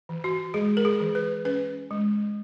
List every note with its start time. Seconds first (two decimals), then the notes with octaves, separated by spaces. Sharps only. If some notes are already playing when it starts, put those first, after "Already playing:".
0.09 E3
0.24 F#4
0.54 G#3 G#4
0.77 A#4
0.85 G#4
1.00 E3
1.15 B4
1.45 C#4 B4
1.91 G#3